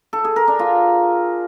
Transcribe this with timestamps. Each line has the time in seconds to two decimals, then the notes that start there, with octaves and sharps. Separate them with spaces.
0.13 A4
0.24 G#4
0.36 A#4
0.48 D4
0.59 F4